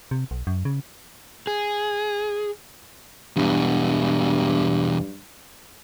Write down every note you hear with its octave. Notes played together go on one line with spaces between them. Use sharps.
C3
B1
F#2
C#3
G#4
E2 G2 B2